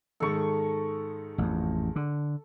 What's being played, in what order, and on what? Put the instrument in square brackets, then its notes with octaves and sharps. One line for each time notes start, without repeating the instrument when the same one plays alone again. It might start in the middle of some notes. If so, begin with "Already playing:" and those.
[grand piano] G#2 D#3 G#3 [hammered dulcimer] A4 C#6
[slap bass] A1 F2
D3